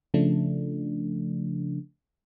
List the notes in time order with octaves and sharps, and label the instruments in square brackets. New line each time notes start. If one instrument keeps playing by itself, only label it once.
[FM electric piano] C#3 F3 A3 D4